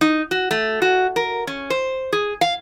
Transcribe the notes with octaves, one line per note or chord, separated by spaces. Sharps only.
D#4
F#4
A3
F#4
A#4
C#4
C5
G#4
F5